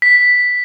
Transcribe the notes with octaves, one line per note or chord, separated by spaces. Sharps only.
B6